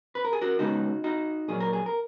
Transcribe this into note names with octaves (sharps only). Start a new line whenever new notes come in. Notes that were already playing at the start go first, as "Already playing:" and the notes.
B4
A#4
G#4
F#4 A#4
C#3 G#3 B3 D#4 F#4
D#4 F#4
A#2 F#3 A#3 G#4
A#4
G#4
A#4